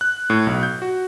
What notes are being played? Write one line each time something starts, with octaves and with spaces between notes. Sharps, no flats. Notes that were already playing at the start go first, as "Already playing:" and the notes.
F#6
A2
B1
G6
F#4